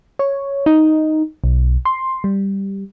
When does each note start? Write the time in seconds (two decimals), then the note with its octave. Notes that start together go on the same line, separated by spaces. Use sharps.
0.19 C#5
0.66 D#4
1.44 B1
1.85 C6
2.24 G3